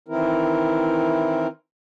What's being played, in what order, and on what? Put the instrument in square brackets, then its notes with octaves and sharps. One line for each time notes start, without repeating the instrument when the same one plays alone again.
[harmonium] D#3 E3 C4 E4 A#4